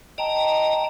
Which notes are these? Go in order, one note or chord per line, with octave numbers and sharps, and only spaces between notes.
D#5 G5 A5 A#5